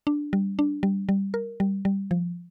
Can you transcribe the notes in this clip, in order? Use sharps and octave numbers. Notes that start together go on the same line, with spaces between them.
D4
G3
D4
G3
G3
A#4
G3
G3
F3